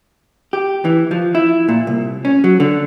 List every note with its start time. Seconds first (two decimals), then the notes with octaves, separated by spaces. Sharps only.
0.53 G4
0.85 E3
1.11 F3
1.35 E4
1.69 A#2
1.87 C2
2.25 C#4
2.44 F#3
2.60 D3